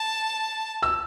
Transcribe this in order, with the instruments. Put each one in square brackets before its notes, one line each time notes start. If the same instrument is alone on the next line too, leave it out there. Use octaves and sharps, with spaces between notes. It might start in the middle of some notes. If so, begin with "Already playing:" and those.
Already playing: [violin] A5
[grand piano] E6